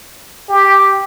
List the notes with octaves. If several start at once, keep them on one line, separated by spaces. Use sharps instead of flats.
G4